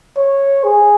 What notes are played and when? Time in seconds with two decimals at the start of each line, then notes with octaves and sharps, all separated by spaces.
0.17 C#5
0.64 G#4